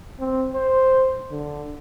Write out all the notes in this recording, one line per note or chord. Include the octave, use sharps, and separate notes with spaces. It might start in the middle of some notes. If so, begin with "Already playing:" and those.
C4
C5
D3